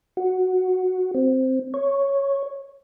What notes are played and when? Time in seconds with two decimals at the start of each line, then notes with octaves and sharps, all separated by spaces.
0.17 F#4
1.14 C4
1.74 C#5